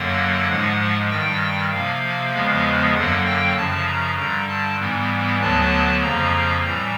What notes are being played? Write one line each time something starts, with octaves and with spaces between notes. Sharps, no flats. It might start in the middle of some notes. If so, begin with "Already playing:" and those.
Already playing: F#2 D3 F#3 A#3 F#5
G#2 F3 G#3
G2 D#3 G3 G5
C3 F3 A#3 F5
E2 C#3 F3 G#3 B3
F#2 D3 F#3 A#3 F#5
G5
F#2 C#3 F3 A5
A#5
G2 D3 G3 A#5
A5
G#2 E3 G3 B3
D2 D3 F#3 B3 A5
F2 C#3 F3 A#3 A#5
A2 E3 G3 A#5